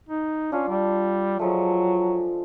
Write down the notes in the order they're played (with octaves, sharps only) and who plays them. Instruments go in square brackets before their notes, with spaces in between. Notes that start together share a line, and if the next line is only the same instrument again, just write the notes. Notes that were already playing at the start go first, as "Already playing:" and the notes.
[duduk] D#4
[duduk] C#4 [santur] D4 F4 F5
[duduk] G3
[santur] F3 G#3 A3 [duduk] F#3